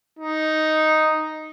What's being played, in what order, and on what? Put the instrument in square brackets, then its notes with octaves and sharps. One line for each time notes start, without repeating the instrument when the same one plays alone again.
[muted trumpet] D#4